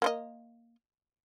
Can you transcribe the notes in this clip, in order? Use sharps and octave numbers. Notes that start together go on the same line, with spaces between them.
A#3 C5 D#5